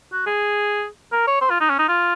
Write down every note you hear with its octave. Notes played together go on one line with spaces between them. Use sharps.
F#4
G#4
A#4
C#5
C5
F4
D#4
C#4
D#4
F4